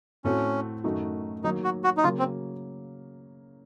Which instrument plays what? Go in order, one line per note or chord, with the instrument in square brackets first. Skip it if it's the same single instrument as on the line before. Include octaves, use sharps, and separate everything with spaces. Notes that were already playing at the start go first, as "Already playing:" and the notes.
[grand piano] A2 A3 C4 F#4 [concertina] C#4
[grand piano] F#2 D#3 A3 D#4 F#4
[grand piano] D#3 F#3 A#3 [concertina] D#4
[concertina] F#4
F#4
D#4
[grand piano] C#3 F#3 A#3 [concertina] F4
[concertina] C4